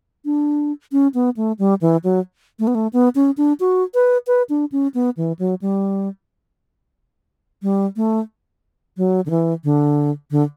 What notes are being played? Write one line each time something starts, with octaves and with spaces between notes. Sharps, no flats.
D4
C#4
B3
A3
G3
E3
F#3
A3
B3
A3
B3
C#4
D4
F#4
B4
B4
D4
C#4
B3
E3
F#3
G3
G3
A3
F#3
D3
E3
D3
D3